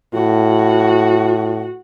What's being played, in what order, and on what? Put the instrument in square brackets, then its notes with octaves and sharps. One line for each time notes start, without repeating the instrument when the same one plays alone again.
[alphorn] A2 [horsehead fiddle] F#4